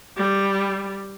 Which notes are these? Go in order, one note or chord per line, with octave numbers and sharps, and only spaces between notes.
G3